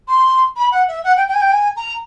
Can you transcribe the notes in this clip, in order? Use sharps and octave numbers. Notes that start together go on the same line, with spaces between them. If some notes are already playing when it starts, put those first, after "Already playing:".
C6
B5
F#5
E5
F#5
G5
G5
G#5
G5
G#5
A#5